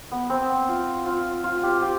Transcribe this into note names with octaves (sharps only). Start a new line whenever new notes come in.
B3
C4
F4
F4
F4
G4
G4